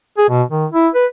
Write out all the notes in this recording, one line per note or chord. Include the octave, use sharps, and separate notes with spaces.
G#4
B2
D#3
E4
B4